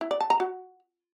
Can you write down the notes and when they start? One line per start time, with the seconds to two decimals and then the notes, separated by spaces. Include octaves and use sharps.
0.01 E4
0.11 D5
0.21 A5
0.30 A#5
0.40 F#4